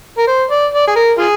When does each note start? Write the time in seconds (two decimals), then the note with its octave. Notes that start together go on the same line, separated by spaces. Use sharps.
0.18 A#4
0.27 C5
0.51 D5
0.74 D5
0.87 G#4
0.96 A#4
1.18 F4 G#4